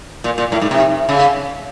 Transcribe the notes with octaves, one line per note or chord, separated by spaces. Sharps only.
A#2
A#2
A2
G#2
C3
C#3